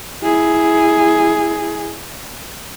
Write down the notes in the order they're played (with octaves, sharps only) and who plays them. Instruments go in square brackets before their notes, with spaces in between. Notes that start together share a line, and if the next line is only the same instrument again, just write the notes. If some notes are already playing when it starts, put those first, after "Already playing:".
[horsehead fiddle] E4 G#4